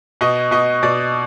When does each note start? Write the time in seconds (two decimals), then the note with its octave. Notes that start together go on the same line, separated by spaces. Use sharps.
0.21 B2 D#5
0.51 B2 D#5
0.83 B2 D5